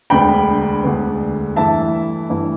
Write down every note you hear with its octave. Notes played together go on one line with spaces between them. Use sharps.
E1 D2 D3 B3 G5 B5
E1 D2 D3 B3
G2 E3 A3 E4 E5 A5
G2 E3 A3 E4